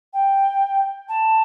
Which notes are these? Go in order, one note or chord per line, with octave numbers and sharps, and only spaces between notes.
G5
A5